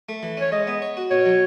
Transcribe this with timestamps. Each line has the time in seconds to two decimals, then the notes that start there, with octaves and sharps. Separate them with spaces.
0.09 A3
0.23 E3
0.37 C#4 C#5
0.52 G#3 D#5
0.67 B3
0.82 C#5
0.97 F#4
1.11 B2 C#5
1.26 F#3